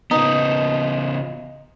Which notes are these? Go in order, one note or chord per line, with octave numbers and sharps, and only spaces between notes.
C#3 B3 D#4